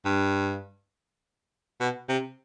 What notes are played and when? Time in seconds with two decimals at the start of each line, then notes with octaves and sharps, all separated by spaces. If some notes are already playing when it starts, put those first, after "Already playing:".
0.05 G2
1.80 B2
2.09 C3